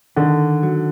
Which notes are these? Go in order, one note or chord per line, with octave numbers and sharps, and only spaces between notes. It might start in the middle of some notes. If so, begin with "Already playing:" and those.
D3 D#3
F#3